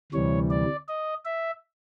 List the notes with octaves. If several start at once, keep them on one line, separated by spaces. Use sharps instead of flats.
D2 C3 E3 G3 C#5
D5
D#5
E5